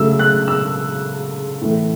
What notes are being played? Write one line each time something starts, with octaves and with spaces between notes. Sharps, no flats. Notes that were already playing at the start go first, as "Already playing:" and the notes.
Already playing: C#3 F#3 A3 E6
F#6
E6
A2 E3 A3